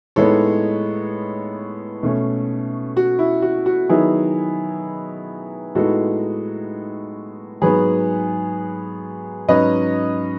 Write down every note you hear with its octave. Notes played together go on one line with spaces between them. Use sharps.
A2 G#3 B3 D#4 A4 C#5
B2 A3 C#4
F#4
E4
F#4
F#4
D#3 F#3 B3 D#4 E4 G#4
A2 G#3 B3 D#4 F#4 A4
G#2 F#3 B3 G#4 B4
G#2 F#3 C#4 B4 D#5